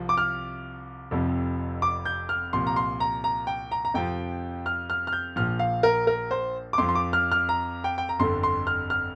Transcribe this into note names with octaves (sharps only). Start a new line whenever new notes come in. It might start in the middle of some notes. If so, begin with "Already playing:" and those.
Already playing: C2 C3 F3
D6
F6
F1 F2 C3 F3
D6
G6
F6
C2 A#2 F3 C6
A#5
C6
A#5
A#5
G5
A#5
A#5
F2 C3 F3 G5
F6
F6
F6
G6
A#1 A#2 F3 F6
F5
A#4
A#4
C5
D6
F2 F3 C6
C6
D6
F6
F6
A#5
G5
G5
A#5
G1 F2 D3 C6
C6
F6
F6